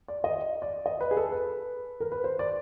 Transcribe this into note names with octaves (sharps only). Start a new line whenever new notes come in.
D5
D#5
D5
D#5
B4
G#4
A4
B4
A#4
B4
C5
D5